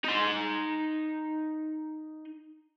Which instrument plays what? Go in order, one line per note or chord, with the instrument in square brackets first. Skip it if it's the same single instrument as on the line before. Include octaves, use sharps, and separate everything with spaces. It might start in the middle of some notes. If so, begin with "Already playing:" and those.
[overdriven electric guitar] D#4 C6